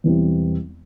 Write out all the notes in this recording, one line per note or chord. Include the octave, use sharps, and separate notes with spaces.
E1 E2 E3 G3 C4